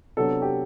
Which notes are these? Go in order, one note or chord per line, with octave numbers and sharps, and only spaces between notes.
C3 F#3 B3 D4 A4
G4